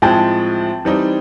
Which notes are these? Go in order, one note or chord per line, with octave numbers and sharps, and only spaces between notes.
A2 F3 G#3 C4 G5 A5
E3 G3 C4 D#4